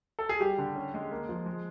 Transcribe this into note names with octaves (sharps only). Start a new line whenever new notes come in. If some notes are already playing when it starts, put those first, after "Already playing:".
A4
G#4
G3 G4
D3
C#4
G#3
A#3
F3
G#3